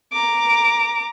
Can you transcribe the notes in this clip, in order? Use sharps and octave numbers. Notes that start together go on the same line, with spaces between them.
A#5 D6